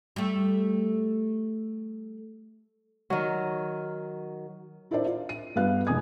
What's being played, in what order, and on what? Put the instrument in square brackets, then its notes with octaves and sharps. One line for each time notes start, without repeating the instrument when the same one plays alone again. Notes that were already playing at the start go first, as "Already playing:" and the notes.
[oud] G3 A3
[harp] D#3 F#3
[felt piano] D4 E4 F4 A#4 C5 D5
F4
D#7
G2 A3 B3 F4 F5 F#6
F1 G#3 G#5 D#6 G#6